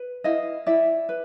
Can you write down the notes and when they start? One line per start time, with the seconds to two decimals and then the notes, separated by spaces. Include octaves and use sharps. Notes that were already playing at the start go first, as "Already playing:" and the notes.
Already playing: B4
0.24 E4 D#5 F5
0.67 E4 D5 E5
1.09 B4